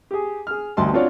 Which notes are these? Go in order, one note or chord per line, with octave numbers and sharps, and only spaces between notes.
G4 G#4
G#4 F6
A1 D2 G2 D#5 A5 C6
C4 D4 F4 F#4 C#5 D5